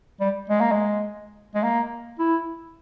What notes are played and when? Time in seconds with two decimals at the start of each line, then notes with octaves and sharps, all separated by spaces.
0.20 G3
0.50 G#3
0.60 A#3
0.71 G#3
1.55 G#3
1.63 A#3
2.19 E4